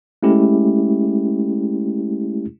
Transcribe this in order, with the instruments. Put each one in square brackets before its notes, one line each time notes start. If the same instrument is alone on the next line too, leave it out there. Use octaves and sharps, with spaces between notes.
[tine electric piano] G#3 A3 C#4 E4 G4